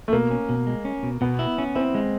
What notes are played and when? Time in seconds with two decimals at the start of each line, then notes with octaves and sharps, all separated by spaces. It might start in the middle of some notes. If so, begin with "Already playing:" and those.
0.08 A3
0.12 B2 A#3
0.31 C#4
0.49 B2
0.67 G#3
0.85 C#4
1.03 B2
1.21 B2 B3
1.39 E4
1.58 C#4
1.75 C4 E4
1.95 G#3